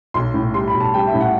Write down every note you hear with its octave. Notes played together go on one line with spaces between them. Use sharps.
B1 C6
A2
G3 C6
B5
B1
A5
G3 G5
E5
A2
F#5